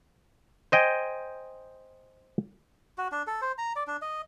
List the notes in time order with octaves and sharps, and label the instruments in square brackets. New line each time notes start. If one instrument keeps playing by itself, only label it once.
[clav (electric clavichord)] C5 D#5 G5 G#5
[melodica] F#4
D4
A4
C5
A#5
D5
D4
D#5